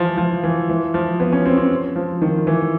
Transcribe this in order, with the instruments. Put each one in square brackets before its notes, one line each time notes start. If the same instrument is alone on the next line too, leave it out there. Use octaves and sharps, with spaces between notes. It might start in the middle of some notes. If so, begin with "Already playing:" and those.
Already playing: [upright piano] E3 F3
F3
E3
E3
F3
B3
C#4
C4
C4
F3
D#3
E3